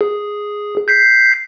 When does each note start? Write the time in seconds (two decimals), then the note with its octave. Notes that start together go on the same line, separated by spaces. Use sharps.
0.01 G#4
0.88 G6 B6 C7